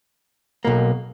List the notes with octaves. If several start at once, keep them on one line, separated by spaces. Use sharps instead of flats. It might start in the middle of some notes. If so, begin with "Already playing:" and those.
B1 B2 A#3